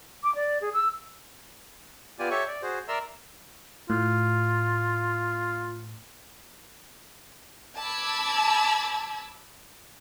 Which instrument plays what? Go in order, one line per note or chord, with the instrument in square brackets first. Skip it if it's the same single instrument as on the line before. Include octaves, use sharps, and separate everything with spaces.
[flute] D6
D5
G#4
E6
[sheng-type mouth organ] B3 F4 G4 D5 G#5
G4 A4 C#5 E5 C#6
D5
F#4 G#4 C5
A#4 D5 E5 A#5 C6 E6
[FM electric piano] A2 [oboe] F4
[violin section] A5 B5 D6 E6 G#6